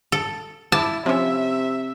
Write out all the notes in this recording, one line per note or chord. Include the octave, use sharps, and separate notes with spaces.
A4
E4 A5 D6
C3 F3 C#4 E5